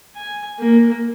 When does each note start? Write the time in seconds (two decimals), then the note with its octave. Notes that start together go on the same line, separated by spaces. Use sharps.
0.16 G#5
0.60 A#3